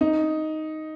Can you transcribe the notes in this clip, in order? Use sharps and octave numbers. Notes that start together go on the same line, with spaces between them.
D#4